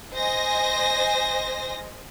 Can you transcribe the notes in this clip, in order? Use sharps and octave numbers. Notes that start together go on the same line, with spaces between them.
C5 D#5 G#5 A#6